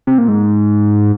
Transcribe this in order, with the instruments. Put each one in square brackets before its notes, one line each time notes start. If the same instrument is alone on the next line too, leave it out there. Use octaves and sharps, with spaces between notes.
[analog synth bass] C3
A#2
G#2